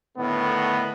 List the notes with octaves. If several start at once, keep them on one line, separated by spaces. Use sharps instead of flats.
A2 D3 D#3 A3 B3